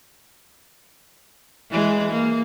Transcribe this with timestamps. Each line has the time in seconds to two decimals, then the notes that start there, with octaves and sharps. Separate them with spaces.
1.70 E3 G#3
2.11 A#3